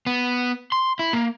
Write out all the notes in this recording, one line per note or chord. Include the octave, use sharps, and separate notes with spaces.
B3
C6
E4
A#3